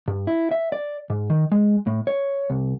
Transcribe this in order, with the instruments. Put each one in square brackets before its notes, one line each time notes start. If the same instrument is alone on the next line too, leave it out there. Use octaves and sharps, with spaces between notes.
[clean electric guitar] G2
E4
E5
D5
G#2
D#3
G#3
A2
C#5
C2